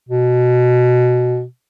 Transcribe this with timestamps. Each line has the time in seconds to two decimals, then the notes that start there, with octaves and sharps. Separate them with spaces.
0.09 B2